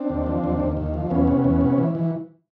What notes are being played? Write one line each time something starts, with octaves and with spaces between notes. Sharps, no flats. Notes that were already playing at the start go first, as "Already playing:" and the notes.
Already playing: C4 D4
D#2
F3
D#2
D#2
D#2
F3
E2 B3 C#4
C3
E2
C3
E3
E3